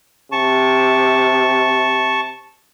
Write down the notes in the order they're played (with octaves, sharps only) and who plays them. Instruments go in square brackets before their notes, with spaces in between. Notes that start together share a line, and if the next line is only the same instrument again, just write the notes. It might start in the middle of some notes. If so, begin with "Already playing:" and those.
[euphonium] C3 [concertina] A5 C#6